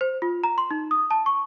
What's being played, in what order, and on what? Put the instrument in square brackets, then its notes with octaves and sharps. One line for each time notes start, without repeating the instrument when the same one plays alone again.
[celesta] C5
F4
A#5
C6
D#4
D#6
A5
C#6